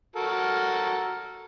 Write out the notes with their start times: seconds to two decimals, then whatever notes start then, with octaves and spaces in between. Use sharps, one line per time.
0.16 F#4 A4 A#4